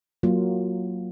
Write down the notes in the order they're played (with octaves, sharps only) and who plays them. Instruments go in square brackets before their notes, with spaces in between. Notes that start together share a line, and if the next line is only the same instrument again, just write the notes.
[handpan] F#3 A#3 F4